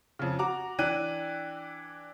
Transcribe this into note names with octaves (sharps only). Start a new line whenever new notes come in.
F2 C#3
F#4 A#5 D6
E3 D4 G5 F#6 D#7